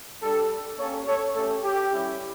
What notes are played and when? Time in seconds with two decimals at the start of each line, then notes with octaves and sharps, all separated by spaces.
0.22 G3 D4 G4 A4
0.79 A#3 C#4 G4 A4 C#5
1.06 A4 C#5
1.35 A3 C#4 G4 A4
1.62 G4
1.92 G3 C#4 E4